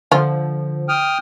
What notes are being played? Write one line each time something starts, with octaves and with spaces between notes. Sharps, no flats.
D3 F3 F4
G5 D#6 F6